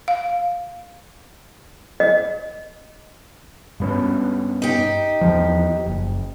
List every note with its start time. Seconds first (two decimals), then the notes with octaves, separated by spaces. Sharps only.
0.08 F5
2.00 D#5
3.80 G2 B3 C#4
4.62 D#4 G4
5.21 E2 F3
5.86 F#1